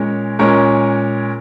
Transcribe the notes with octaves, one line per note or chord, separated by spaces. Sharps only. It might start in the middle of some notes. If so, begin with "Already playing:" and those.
Already playing: A#2 G#3 C#4 A#4 C#5
A#2 G#3 C#4 A#4 C#5